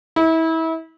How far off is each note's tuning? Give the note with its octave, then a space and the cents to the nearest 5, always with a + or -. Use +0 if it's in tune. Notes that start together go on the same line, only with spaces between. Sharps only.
E4 -30